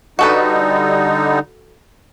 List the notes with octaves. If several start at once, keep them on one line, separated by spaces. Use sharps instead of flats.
D3 G3 D#4 F#4 A4 B4